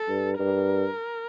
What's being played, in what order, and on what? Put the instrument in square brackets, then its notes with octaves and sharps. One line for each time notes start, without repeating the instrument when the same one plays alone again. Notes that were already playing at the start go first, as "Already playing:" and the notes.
Already playing: [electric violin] A4
[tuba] G2
[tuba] G2 [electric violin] A#4